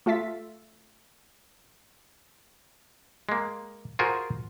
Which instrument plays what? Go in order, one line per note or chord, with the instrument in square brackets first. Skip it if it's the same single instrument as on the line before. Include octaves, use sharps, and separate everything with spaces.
[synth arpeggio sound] A3 F4 E5 A6 B6
[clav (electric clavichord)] G#3 A#3
F4 F#4 G#4 A#4 C5